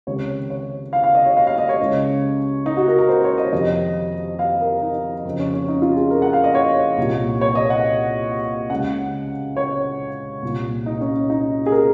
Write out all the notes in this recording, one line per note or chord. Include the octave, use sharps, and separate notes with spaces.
C#2 C3 D#3 C#5
C#5
F5
F5
D#5
C#5
F5
F5
D#5
C#5
C#2 C#3
D#4
F#4
A#4
A#4
C5
C#5
D#5
F2 C3 D#3 D#5
F5
A#4
D#4
F2 C#3 C4
C#4
C#4
D#4
F4
G#4
A#4
F#5
F5
D#5
C#5
C2 A#2
C#5
D#5
F#5
C#2 C#3 F#5
C#5
C2 A#2
D#4
C#4
D#4
G#4
A#4